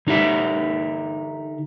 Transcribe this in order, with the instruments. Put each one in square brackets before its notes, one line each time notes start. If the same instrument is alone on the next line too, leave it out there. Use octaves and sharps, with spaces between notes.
[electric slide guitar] D3 D#4 G4 E5